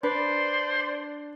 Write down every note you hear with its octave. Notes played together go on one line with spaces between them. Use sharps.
D4 B4 C5 D5